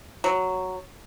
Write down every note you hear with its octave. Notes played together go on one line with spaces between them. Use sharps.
F#3